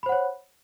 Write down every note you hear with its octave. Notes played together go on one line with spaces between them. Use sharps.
C5 C#5 F#5 B5